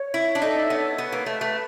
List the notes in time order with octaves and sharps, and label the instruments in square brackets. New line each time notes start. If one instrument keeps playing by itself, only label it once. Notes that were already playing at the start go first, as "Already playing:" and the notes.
Already playing: [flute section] C#5
[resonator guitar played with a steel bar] E4 [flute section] E5
[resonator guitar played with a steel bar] D4
[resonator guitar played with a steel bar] D#4 [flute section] A4
[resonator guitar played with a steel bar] B3 [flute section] C#5
[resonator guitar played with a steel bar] B3 [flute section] B4
[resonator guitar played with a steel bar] A#3
[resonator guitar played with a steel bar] A3 [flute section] B4
[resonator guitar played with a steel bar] A3